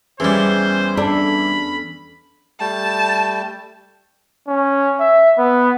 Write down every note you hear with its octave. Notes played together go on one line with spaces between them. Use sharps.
E2 E3 G3 C#4 G#4 C5
D4 A4 B5
G3 A3 G5 A5
C#4
E5
B3